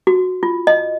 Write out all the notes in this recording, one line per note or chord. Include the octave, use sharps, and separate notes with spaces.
F#4
F4
D#5